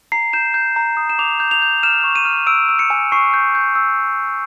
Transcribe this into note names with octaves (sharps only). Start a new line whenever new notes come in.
A#5 C7
G6 E7
G6
A#5
D#6
E7
D6 F7
G6
F7
G6
F6 E7
C#6
D#7
F6
E6 D7
E6
C#7
G#5
C#6 C7
G6
G6
E6